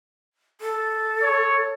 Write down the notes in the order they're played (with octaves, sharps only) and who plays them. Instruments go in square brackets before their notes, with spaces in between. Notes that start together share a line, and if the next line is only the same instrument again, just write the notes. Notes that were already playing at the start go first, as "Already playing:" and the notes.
[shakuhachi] A4
[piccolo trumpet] C#5